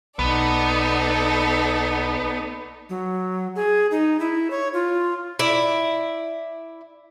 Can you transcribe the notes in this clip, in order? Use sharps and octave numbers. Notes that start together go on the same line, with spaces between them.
B1 B3 D#4 A4 D5
F#3
G#4
D#4
E4
C#5
F4
E4 D5